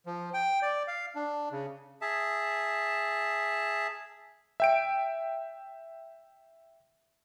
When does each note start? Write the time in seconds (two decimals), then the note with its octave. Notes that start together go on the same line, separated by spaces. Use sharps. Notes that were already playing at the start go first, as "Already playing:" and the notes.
0.06 F3
0.34 G5
0.62 D5
0.88 F5
1.15 D4
1.51 C#3
2.01 G#4 E5 A5
4.60 E5 G5 D7